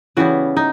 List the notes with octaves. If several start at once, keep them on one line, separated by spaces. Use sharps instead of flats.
C#3 E3 G3 B3 F#4
D#4